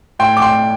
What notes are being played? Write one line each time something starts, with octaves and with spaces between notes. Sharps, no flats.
A2 G5 C6
D6
G5 C6